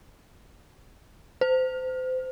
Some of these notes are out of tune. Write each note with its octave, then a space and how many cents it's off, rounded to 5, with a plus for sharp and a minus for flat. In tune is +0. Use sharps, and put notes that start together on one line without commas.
C5 -30